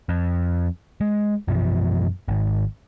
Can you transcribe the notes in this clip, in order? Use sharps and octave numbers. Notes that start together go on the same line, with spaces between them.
F2
G#3
F#2 B2 E3 F3
G#1